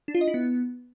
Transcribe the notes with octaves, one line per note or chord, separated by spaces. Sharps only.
D4
F4
D#5
E4
B3